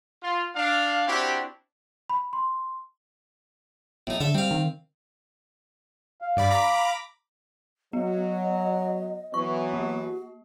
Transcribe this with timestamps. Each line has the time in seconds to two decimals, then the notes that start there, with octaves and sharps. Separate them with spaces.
0.23 F4
0.56 D4 F5
1.07 C4 D4 E4 F#4 G4
2.10 B5
2.33 C6
4.07 B1 A2 D#4
4.20 D3 A4 E5
4.35 G3 C4 F5
4.51 D#3
6.22 F5
6.37 G2 D5 B5
6.51 A#5 B5 D6
7.93 F#3 B3 D#5
9.34 E3 F#3 B3 C#6
9.73 A#3 F#4